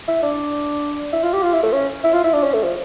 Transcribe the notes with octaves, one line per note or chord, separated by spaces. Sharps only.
E4
D4
E4
F4
G4
F4
E4
A3
C#4
E4
F4
E4
D4
C#4
A3
F3